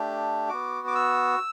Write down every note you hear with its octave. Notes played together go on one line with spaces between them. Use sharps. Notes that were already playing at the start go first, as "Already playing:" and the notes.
Already playing: A3 D4 G4
B3 F#4 D6
D6
E6